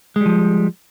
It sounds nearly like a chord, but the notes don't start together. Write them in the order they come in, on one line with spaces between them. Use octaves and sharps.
G#3 G3 F3